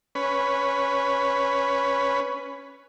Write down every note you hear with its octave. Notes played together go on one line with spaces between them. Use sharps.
C#4 B4